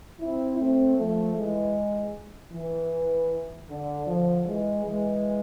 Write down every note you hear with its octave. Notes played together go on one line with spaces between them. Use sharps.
C4 E4
A3 C4
F3 A3
E3 G#3
E3
D3
D3 F3
E3 G#3
E3 G#3